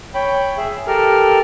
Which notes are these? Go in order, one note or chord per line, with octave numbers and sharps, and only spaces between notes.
C#5 G5 B5
G#4 E5
G4 A4 A#4 F6